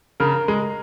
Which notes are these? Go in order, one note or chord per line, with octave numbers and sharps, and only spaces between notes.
C#3 A#4
G#3